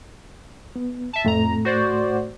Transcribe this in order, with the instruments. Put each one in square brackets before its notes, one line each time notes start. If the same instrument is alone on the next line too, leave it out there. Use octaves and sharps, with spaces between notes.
[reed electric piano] B3
[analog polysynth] E5 A5
[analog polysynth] F2 A#5 [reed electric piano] A2 A3
[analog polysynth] F#4 C5 D5